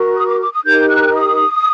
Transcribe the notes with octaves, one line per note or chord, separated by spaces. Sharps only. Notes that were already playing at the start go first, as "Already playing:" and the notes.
Already playing: F#4 A#4
D#6
D6
D6
D#6
D#4 G4 A#4 G6
F#6
D#6